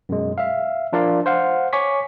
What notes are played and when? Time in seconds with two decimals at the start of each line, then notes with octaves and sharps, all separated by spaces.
0.09 F#2 B2 G#3
0.38 E5 F5
0.93 F3 D4 F4 A#4 D5 F5
1.26 C5 F5 F#5
1.73 C#5 G#5 C#6 D6 B6